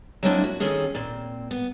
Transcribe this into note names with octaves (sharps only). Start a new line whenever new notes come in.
F#3 G#3 A#3 C4 D4 E4
F#4
D#3 C4 C#4 G#4 A4
A#2 C4
B3